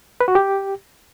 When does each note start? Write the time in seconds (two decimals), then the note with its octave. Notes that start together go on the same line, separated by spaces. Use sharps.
0.21 B4
0.28 F#4
0.35 G4